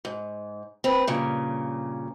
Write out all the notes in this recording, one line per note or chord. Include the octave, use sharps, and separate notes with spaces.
G#2
C4 B4
G2 A#2 C#3